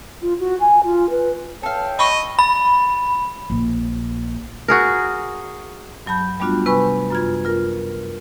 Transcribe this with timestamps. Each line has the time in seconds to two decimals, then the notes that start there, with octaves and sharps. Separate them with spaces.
0.22 F4
0.39 F#4
0.60 G#5
0.84 F4
1.10 B4
1.63 A4 C#5 E5 F5 G5
1.99 D#5 B5 C#6
2.39 B5
3.50 A#1
4.68 F#4 G#4 A#4
6.06 G2 F#3 A5 B5 G6
6.40 G3 A3 B3 D4 F4 F#4
6.66 C3 B4 G#5 B5 C#6
7.10 F#2 F4 G#6
7.45 F4 A#4